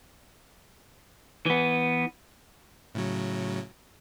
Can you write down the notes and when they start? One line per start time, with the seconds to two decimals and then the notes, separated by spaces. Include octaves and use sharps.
1.46 E3 B3
2.95 A2 C#3 F#3